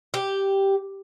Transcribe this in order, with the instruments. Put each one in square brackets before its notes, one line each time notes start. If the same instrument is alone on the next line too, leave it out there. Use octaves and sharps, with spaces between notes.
[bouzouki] G4